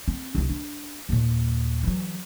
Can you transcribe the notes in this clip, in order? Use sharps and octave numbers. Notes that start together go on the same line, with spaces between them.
C4
C2 E4
D4
D#2 A#2
E3 F#3